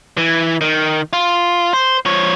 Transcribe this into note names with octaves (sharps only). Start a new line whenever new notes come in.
E3
D#3
F4
C5
F3 C#5